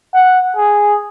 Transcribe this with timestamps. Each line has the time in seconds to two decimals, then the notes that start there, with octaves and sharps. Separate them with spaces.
0.14 F#5
0.57 G#4